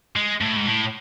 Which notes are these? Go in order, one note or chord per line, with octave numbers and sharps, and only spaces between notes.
G#3
A2
G#2
A2